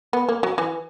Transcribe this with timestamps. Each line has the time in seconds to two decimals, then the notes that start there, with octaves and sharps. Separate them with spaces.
0.13 B3
0.29 A#3
0.43 F#3
0.58 E3